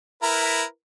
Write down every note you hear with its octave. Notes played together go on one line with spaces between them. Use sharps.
E4 A#4 B4